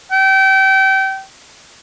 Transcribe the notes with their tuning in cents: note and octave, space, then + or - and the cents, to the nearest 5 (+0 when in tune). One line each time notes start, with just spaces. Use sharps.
G5 -30